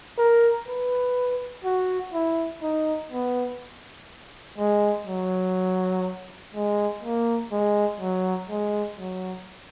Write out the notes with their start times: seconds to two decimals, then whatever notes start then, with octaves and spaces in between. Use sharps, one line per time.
0.18 A#4
0.67 B4
1.64 F#4
2.13 E4
2.62 D#4
3.12 B3
4.58 G#3
5.07 F#3
6.54 G#3
7.03 A#3
7.52 G#3
8.00 F#3
8.49 G#3
8.99 F#3